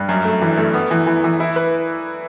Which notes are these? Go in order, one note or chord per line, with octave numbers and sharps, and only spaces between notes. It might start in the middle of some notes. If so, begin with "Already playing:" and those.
Already playing: G2
F#2
A3
E3
A3
B3
E3
E3
E3
E4
B4